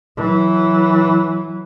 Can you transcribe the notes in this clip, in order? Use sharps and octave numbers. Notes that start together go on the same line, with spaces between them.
E3 F#3